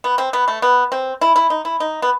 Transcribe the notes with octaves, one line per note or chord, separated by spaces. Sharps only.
B3
C4
B3
A3
B3
C4
E4
E4
D#4
E4
D#4
B3